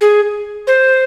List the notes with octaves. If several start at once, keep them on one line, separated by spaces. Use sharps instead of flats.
G#4
C5